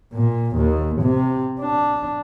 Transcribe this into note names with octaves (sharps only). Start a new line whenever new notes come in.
A#2
D#2
C3
D4